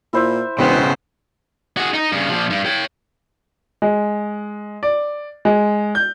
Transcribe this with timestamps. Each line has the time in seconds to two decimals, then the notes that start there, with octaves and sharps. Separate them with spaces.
0.13 A#2 E4 C5 E5
0.59 E1 C#3 B3 C4 C5 F#5
1.77 F#4 G#4
1.94 D#4
2.12 G2 C#3
2.30 A#2 F3
2.51 G2
2.65 C#5 G5
3.82 G#3
4.83 D5
5.45 G#3
5.95 G6